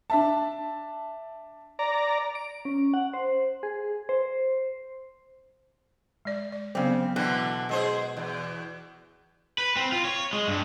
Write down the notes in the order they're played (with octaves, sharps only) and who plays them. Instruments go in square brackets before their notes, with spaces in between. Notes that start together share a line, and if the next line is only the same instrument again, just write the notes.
[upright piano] D4 E5 A5
[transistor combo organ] D5 A#5
[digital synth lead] D7
C#4
F#5
C5
G#4
C5
[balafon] G#3 D5
D5
[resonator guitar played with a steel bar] C#3 C4 [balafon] F#3 B3
[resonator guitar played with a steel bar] B2 [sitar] D3 E3
[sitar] G#3 G#4 C5 [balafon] D#5
[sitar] E2
[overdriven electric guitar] B4
C4
F4
C#5
G#3
G2